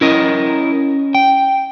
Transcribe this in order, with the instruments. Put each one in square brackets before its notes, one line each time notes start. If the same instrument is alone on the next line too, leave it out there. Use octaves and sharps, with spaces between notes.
[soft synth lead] C#4 [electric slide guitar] E4 A#4 D#5
[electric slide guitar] G5